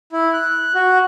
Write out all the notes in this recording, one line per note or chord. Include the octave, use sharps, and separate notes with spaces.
E4
F#6
F#4